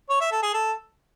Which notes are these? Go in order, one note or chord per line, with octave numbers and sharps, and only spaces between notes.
C#5
E5
A4
G#4
A4